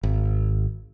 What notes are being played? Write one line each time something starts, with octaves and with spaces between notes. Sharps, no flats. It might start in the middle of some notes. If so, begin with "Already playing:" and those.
G#1